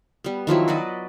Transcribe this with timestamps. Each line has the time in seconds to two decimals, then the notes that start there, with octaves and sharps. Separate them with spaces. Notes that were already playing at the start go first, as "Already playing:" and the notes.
0.24 G3 B3
0.47 D#3 F3 F#3 E4
0.68 F#4 B4 D5 D#5